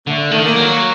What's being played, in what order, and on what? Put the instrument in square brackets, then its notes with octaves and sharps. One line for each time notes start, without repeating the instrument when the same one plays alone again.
[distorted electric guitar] D3 [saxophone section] A3
[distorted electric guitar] D#3 [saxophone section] A3
[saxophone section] A#3
[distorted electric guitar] F#3